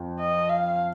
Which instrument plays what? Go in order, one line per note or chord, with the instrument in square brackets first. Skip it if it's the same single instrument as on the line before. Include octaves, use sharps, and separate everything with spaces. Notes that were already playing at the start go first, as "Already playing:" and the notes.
Already playing: [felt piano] F2
[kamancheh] D#5
F5